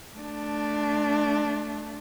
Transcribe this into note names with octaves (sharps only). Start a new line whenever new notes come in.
A3 D4